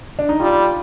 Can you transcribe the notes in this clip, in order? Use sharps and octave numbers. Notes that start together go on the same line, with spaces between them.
D4
D#4
G3 F4